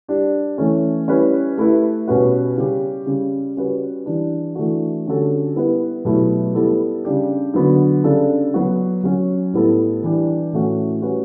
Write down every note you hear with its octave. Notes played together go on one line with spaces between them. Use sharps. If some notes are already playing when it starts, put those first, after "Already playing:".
G3 D4 G4
E3 A3 C#4
G3 C#4 E4 G4 B4
A3 E4 G4 B4
B2 G3 C#4 F#4 B4
C#3 G3 C#4 G4
C#3 G3 C#4
G3 C#4 F#4 B4
E3 G3 D4
E3 A3 D4 F#4
D3 G3 C#4 F#4 A4
G3 B3 E4 G4 B4
B2 F#3 A3 E4 G4
G3 B3 E4 A4
C#3 G3 D4 G4
D3 F#3 B3 F#4
C#3 G3 D4 A4
F#3 B3 F#4
F#3 C#4 F#4
A2 G3 B3 E4 A4
E3 G3 D4 G4
A2 E3 A3 C#4 F#4
G3 C#4 F#4 B4